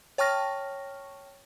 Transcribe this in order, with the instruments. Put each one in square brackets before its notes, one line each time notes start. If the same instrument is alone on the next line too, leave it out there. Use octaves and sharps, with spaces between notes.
[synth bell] C#5 G5 A5 C#6 F6 A#6